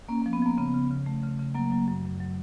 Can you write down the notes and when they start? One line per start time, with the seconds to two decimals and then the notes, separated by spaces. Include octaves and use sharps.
0.09 A#3 C#4
0.22 A#3
0.26 F3
0.33 B3
0.42 F3 A#3
0.58 C#3 B3
0.74 C#3
0.91 C#3
1.06 A3
1.23 C#3
1.39 C#3
1.55 F#3 A#3
1.72 F#3
1.88 F#2
2.05 F#2
2.20 F#3